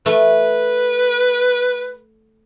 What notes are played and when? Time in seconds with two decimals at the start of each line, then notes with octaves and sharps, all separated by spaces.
0.06 A3 B4